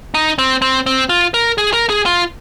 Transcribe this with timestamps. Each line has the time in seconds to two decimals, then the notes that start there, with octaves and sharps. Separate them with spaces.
0.14 D#4
0.38 C4
0.62 C4
0.86 C4
1.09 F4
1.34 A#4
1.58 G#4
1.73 A#4
1.89 G#4
2.06 F4